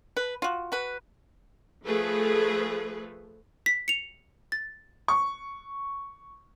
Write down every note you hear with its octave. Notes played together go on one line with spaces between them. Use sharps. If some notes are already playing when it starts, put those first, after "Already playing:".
B4
F4 F#4
F#4 B4
F3 A3 G#4 A4 B4
B6
C#7 F7
A6
C#6